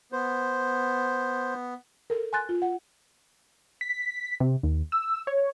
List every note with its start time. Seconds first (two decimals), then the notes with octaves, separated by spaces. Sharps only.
0.12 B3 C5
2.10 A4 A#4
2.33 G#5 C6 F#6 A6
2.49 F4
2.62 F#5
3.81 B6
4.40 C3
4.63 D#2
4.92 E6
5.27 C#5